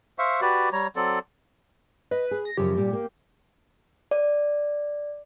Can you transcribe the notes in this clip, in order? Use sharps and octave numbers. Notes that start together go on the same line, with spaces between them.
C5 E5 F5 C#6
F#4 G4 B4 D5
G3 C#5 A#5
F#3 C4 A4 D5
B4 D#5
G#4
A#6
F#2 C#3 F3 G4
A#2 G3
A#3
D5